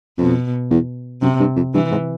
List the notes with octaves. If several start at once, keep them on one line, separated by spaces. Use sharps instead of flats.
F2 B2
E2
F#2 C3
G2
F2
G2 E3
G#2